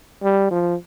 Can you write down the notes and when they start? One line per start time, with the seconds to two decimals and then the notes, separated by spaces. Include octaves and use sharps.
0.22 G3
0.51 F3